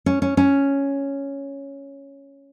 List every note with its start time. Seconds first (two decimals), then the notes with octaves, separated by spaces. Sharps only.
0.06 C#4
0.22 C#4
0.37 C#4